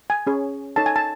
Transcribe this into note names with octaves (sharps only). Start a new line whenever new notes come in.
G#5
C#4 G#4 C#5
D#4 A4 C#5 A5
G#5
A5